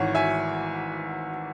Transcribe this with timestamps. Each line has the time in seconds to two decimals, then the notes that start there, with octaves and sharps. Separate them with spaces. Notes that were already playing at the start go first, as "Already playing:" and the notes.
Already playing: G#1 G#2 E3 C#5 F#5
0.15 E5 G#5